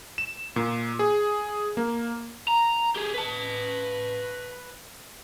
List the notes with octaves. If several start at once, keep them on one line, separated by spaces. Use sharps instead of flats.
E7
A#2
G#4
A#3
A#5
G4 G#4
B4 A5